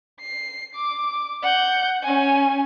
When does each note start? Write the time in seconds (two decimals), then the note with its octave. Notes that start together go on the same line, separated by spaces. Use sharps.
0.21 C7
0.75 D6
1.42 F#5 G6
2.02 C#4 G#5